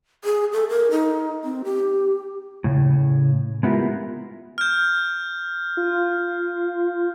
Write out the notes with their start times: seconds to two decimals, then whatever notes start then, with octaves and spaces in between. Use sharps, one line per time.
0.24 G#4
0.53 A4
0.69 A#4
0.91 D#4
1.44 C4
1.64 G4
2.64 A2 C#3
3.63 G#3 B3 E4 F4 G4 A#4
4.58 F6 G6
5.77 F4